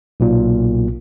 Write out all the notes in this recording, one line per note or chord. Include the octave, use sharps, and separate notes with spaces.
B1 A#2